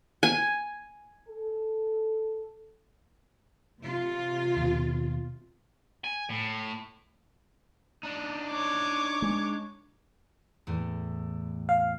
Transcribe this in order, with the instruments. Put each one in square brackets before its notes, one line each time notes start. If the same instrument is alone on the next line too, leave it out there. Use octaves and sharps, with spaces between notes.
[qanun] G#5
[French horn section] A4
[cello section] C3 F4
[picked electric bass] D#2 B2
[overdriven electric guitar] G#5
A2
D4 D#4
[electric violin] C#5 D6
[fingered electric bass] G#3
[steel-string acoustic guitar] E2 A2
[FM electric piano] F5